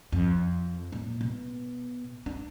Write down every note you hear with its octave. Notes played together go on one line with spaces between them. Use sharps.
F2
A#2
B2
D4